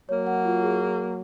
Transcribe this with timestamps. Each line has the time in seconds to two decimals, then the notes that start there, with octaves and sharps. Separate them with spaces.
0.08 F#3 A#3 C#5
0.27 F#5
0.45 F4
0.62 G#4